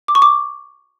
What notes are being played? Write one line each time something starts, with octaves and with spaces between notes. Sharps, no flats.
D6
C#6
D6